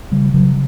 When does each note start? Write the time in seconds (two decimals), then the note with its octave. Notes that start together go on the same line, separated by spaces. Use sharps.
0.11 C#3 G3
0.34 C#3 F#3